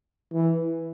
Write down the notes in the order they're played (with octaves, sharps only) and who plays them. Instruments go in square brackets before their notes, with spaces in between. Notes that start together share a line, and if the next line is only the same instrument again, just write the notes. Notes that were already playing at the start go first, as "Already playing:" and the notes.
[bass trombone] E3